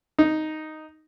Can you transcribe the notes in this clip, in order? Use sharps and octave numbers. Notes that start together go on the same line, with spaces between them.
D#4